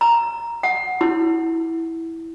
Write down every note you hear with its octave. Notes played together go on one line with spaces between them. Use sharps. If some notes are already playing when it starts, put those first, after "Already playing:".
A#5
F#5
E4